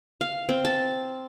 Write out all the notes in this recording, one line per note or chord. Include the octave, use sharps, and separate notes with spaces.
F5
C4
A5